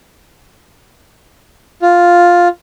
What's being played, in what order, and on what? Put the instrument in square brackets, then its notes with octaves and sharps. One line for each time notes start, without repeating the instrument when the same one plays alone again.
[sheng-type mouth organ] F4